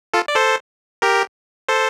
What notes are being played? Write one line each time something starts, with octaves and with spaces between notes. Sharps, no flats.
F4 A4
D5
A4 C5
G4 A#4
A4 C5